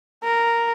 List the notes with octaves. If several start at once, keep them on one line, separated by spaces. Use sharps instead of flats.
A#4